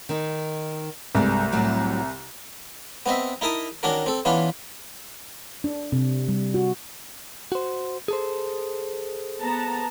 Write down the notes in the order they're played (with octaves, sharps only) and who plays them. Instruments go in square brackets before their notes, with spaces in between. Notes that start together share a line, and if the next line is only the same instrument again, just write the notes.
[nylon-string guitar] D#3 D#4
[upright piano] C2 [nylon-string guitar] G2 G#3 A3
[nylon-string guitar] A2 F#3 G3
[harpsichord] B3 C4 D#5 E5
D#4 E4 A#4 A5 D#6
D#3 C#4 D4 F#4 A#4
C4 A4
E3 B3 C#4 D4 F4
[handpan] D4
C3
G3
F#4
[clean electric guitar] F#4 C5
G#4 A4 C5
[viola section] B3 A5 A#5